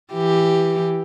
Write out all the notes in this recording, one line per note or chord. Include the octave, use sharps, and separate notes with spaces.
E3 G4